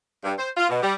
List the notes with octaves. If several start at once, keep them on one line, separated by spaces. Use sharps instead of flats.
G2
C5
F4
B2
G3